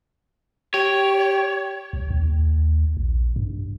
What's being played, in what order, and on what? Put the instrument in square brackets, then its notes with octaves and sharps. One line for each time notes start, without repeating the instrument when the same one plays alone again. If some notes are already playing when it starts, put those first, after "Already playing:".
[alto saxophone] G4 [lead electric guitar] C#5
[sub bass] C2
D#2
A#1
G2